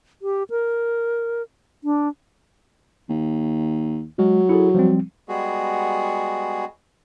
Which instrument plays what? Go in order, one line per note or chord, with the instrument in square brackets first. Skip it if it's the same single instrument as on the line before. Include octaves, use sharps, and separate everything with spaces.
[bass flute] G4
A#4
D4
[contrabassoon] D#2
[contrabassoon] F#3 [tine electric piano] G#3
[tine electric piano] E4 G#4 A4
F3 G3 C4
[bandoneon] G3 G#3 B3 F#4 G#4